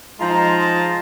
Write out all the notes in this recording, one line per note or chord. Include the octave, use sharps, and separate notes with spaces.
F3 G#3 D#4 F4 A5 A#5